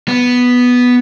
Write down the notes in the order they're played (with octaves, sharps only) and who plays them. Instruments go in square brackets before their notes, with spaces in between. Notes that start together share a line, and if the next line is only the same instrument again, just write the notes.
[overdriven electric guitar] B3